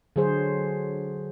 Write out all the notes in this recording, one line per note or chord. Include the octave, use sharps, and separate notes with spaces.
D3 F#3 G#4 C5